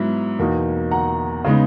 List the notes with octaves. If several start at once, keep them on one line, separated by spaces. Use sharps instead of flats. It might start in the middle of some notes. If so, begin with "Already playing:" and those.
Already playing: G#2 F#3 B3 E4
E2 B2 A#3 D#4
F#5 A#5
C#3 G#3 B3 D#4